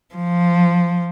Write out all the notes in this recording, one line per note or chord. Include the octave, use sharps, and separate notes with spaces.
F3